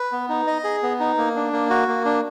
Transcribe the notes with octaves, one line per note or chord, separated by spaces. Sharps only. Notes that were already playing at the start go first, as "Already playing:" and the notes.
Already playing: B4
B3
D#4
D#5
G#4
B3
D#4
A#3
D4
A#3
F#4
A#3
D4